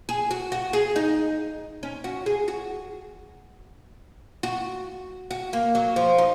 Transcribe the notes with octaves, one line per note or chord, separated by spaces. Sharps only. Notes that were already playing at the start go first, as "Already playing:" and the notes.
G#4
F#4
F#4
G#4
D#4
C#4
F#4
G#4
F#4
F#4
F#4
A#3
F#3
F3
D#4